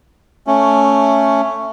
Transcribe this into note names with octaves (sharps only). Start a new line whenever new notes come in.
A3 C#4